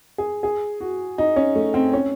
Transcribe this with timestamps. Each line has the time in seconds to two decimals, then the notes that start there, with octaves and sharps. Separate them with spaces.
0.18 G#4
0.43 G#4
0.81 F#4
1.18 D#4
1.36 C#4
1.55 A3
1.74 C4
1.93 C#4